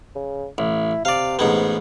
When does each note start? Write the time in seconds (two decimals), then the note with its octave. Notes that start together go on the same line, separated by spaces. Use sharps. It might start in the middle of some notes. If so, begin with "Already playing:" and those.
0.15 C#3
0.58 A1 E4
1.05 C3 D5 F5
1.39 A1 G#2 B3